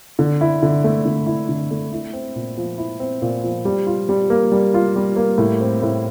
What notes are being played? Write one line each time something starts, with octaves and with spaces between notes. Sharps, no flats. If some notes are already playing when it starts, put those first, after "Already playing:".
D3
E4
D3
A3
D3
E4
D3
A3
E4
C4
A#2
F3
E4
C4
A#2
F3
G3
F4
G3
A#3
G3
F4
G3
A#3
A2
C4
A2